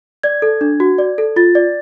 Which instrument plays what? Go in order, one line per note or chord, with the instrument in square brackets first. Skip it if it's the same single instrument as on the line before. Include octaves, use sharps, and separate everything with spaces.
[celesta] D5 G#6
A4
D4
F#4
D5
A4
F4 A6
D5